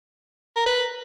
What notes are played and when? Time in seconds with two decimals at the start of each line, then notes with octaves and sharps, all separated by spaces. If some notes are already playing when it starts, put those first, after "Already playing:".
0.56 A#4
0.66 B4